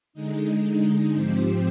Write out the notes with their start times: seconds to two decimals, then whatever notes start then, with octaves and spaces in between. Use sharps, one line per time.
0.13 D3 G#3 D#4
1.14 G#2 F3 C4 G4 C5